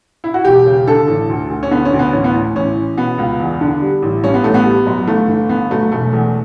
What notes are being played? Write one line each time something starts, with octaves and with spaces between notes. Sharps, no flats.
E4
F#4
E1 G4
C#3
D3 A4
A1
D2
D2
C#4
D3 B3
C#4
D2
B3
A1 C#4
B3
A2 C#4
A1 C#4
E3
B2 B3
C#2
E2
D3
G3
A1
G2 C#4
B3
A1 A3
B3
G3
F#2
G1 A3
G1
G1 B3
F#3 A3
E1 A3
E2